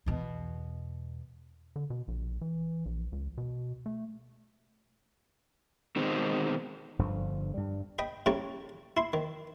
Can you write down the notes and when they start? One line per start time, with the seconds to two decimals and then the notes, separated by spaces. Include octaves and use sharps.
0.06 E2 B2
1.76 D3
1.90 B2
2.08 A#1
2.41 E3
2.86 A#1
3.12 C#2
3.38 B2
3.86 A3
5.96 B2 D#3 G#3 C4
6.99 G1 G2 D3 F3
7.54 G2 G3
7.99 D#5 G5 B5
8.26 A2 C#3 G3 C#5 A#5
8.97 E4 C6
9.13 D#3